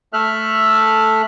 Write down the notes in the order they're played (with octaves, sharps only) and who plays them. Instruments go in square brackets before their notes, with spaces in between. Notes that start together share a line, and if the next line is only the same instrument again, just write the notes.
[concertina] A3 A4 E5 F6 F#6